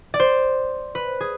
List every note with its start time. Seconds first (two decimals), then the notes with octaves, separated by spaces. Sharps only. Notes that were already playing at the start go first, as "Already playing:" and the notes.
0.14 D5
0.20 C5
0.95 B4
1.20 G#4